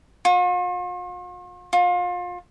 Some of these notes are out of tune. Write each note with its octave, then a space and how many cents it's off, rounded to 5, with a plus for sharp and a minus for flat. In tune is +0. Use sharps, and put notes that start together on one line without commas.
F4 +45
F4 +30